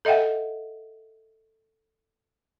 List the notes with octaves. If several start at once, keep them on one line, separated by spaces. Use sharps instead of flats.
A4 D#5 E5 F#5 G5